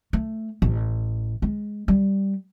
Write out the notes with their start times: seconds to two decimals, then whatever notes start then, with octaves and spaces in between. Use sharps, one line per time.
0.13 A3
0.62 A1
1.42 G#3
1.88 G3